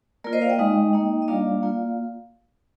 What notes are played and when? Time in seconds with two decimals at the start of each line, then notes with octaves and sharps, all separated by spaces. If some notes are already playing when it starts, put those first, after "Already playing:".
0.24 A#3 F4 A#4 D5
0.33 C5 D#5
0.42 D5 F5
0.50 D#5 G5
0.59 G#3 D#4
0.93 A#3 D#4
1.22 D#5
1.28 G3 A#3 D4 F4 D5 F5
1.63 A#3 F4